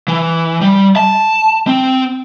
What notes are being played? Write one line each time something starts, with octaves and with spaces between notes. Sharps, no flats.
E3
G3
A5
C4